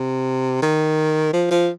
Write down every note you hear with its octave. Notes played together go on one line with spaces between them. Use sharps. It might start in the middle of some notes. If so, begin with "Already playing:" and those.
Already playing: C3
D#3
F3
F3